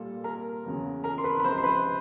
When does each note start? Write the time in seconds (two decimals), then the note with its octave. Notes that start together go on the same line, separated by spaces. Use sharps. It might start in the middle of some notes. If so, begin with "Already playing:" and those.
Already playing: A#2 G3 A#3 A4
0.24 A#4 A#5
0.64 E2 C#3 F#3 B3
1.04 A#4 A#5
1.18 C6
1.24 B4 B5
1.40 B5
1.44 C#2 C3 F3 C5 C6
1.58 C6
1.63 B4 B5